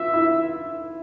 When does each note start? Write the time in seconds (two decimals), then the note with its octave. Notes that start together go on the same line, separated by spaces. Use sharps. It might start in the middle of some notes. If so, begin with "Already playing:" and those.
Already playing: F4 E5
0.14 E4